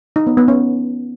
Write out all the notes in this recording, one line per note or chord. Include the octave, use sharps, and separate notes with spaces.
D#4
B3
B3
C#4